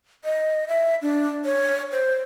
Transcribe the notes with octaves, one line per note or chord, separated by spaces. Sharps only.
D#5
E5
D4
C#5
C5